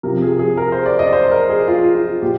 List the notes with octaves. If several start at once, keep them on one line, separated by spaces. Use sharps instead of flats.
C3 F3 A#4
G#4
G#4
A#4
C5
D5
D#5
D5
C5
A#4
G#4
F4
F4
A#2 G4